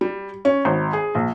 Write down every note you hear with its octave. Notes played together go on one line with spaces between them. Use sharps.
G3
C#4
G#1
G#4
A#1